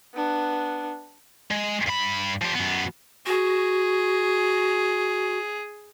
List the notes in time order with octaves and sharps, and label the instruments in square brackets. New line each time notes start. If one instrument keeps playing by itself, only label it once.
[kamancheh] B3 D4
[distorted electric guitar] G#3
G2 B5
F3 G4
F#2 B3
[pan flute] F#4 [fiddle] G#4